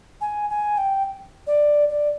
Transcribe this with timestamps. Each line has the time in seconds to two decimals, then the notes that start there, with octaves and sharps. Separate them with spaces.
0.21 G#5
0.50 G#5
0.77 G5
1.47 D5
1.89 D5